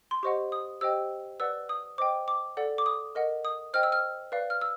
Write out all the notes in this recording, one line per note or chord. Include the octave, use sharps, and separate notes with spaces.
C6
G4 C5 D#5 F#5 C#6
D#6
G4 C5 D#5 G5 E6
B4 D5 F#5 E6
D#6
C5 D#5 G5 D6
D6
A4 D5 F#5
D6
D#6
A#4 D#5 F#5
D#6
C5 D#5 G5 F6
E6
F6
B4 D5 F5
F6
E6